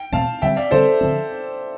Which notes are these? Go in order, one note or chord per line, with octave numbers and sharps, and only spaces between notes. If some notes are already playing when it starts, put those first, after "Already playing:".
Already playing: G5
E2 B2 A3 C4 F5 A5
D3 G3 C4 E5 G5
D5 F5
D3 G3 C4 A4 C5
D3 F3 C4